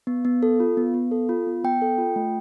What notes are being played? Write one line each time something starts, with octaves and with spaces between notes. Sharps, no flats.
B3
B3
A4
F4
B3
B3
A4
F4
B3
B3 G5
A4
F4
A3